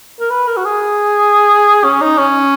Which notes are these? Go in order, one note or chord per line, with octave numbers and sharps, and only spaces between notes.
A#4
B4
A#4
F#4
G#4
C#4
D#4
C#4